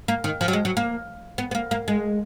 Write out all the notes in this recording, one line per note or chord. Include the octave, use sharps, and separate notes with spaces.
A#3
D#3
F3
F#3
G#3
F#3
A#3
B3
B3
A#3
A#3
G#3